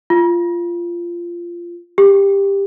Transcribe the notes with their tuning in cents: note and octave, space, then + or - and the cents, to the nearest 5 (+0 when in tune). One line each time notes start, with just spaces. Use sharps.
F4 -15
G4 +15